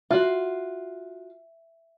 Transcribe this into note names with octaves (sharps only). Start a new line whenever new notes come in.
F4 F#4 E5